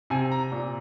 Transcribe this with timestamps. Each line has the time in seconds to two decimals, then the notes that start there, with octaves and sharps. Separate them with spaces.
0.10 C3 G#5
0.32 A#5
0.52 A#2